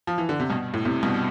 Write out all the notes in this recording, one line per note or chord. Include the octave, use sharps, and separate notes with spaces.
F3
E3
D3
C3
G2 B2
A2
A2 C3
G2 B2